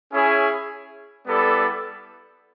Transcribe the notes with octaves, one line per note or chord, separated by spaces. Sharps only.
C#4 E4 G#4 C#5
G3 B3 E4 A4 D5